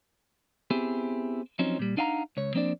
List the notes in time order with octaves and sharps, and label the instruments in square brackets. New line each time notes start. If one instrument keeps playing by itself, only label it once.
[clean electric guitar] B3 C4 E4 G4 G#4
F3 F#3 C4 C#4 D#4
A#2 G3
D4 D#4 F5 F#5 G#5 A#5
C#2 C#5
F3 A#3 C4 D4 D5